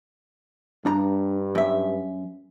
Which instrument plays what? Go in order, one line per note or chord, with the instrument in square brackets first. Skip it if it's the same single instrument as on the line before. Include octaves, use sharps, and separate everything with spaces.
[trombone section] G2 [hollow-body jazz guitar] D4 A#5
[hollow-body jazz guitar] F#2 E5